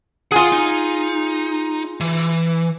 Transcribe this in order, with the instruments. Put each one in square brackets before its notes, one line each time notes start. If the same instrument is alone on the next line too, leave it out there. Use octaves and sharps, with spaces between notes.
[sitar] F4 G#4 [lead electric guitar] F#5
[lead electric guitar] D#4
E3